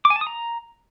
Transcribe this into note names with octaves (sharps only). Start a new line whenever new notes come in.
D6
G#5
A5
D#6
A#5